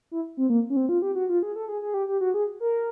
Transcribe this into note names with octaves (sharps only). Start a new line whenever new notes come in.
E4
C4
A#3
C#4
C4
F4
G4
F#4
F4
G#4
A4
G#4
G#4
G4
G4
F#4
G#4
A#4